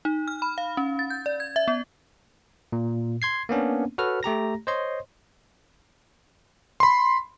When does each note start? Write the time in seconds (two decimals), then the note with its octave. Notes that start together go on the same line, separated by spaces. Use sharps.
0.05 D#4
0.28 F6
0.42 B5
0.58 F5
0.77 C#4
0.99 A6
1.10 G6
1.26 D5
1.40 G#6
1.56 E5
1.68 B3
2.72 A#2
3.22 C6 G#6 C7
3.49 A#3 B3 C#4 D4
3.98 F#4 A4 B4 C#5 F6
4.23 A3 G4 A#5 A#6
4.67 C5 C#5 D#5 C6
6.80 B5 C6